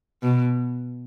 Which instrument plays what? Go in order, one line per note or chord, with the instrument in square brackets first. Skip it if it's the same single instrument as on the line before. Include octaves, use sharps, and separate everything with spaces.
[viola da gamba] B2